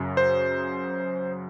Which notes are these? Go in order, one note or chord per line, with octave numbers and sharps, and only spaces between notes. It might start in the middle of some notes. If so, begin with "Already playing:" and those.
Already playing: F#2 C#3 F#3
C5